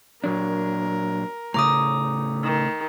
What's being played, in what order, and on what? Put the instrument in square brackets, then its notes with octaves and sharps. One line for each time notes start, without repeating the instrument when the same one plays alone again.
[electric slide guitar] A#2 F#3 D4 [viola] A#4
[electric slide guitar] A2 C#3 A3 [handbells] A#5 D6 D#6
[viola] D#3